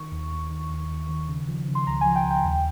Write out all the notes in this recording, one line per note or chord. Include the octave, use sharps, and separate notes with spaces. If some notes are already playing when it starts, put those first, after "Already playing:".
Already playing: D#3 C#6
D#2
D#2
D#3
D#2
D#2
D#3
C#3
F3
C#3
C6
C#2 A#5
G#5
F3
G5
C#2
G5
D#2